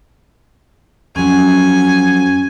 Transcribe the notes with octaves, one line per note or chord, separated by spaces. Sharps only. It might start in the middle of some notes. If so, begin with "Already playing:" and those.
F2 F#3 C#4 G#5